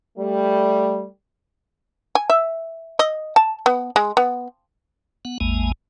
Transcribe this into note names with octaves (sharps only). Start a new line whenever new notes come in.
G3 A3
G#5
E5
D#5
A5
B3
G#3
B3
B3 F#5
A1 E2 G#3 A#3 G#5